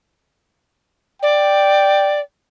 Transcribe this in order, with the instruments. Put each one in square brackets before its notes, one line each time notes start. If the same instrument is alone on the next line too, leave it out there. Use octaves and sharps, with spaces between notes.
[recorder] D5 [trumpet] G5